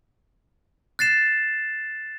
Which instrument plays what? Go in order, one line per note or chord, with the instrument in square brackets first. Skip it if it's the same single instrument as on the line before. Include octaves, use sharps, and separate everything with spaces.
[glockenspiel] F#6 A6 C7 E7